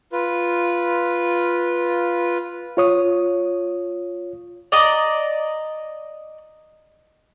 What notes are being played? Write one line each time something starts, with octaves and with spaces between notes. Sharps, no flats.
F4 B4
F4 C#5 D#6
D5 D#5 A#5